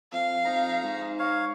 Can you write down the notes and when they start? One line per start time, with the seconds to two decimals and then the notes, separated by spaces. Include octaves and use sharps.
0.12 F2 F5
0.45 F2 D#4 A#5
0.83 G#2
1.19 C#5 F5